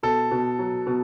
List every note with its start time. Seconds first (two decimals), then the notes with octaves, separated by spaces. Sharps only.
0.03 B2 A4
0.31 B2
0.59 F#3
0.87 B2